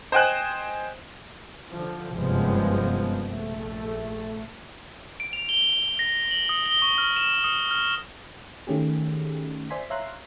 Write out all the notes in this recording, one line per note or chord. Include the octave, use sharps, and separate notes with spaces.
C5 D#5 G5 G#5 F#6
D3 F3
F#1 G2 C3 F3 G#3 B3
A#1 A3
D7
F7
G7
A#6
F#7
D#6
G7
C#6
F6
E7
D#6
F6
D#3 A3 C#4 G4 G#4
C5 D5 E5 G#5 C6 B6
C#5 E5 F5 A#5 C6 F#6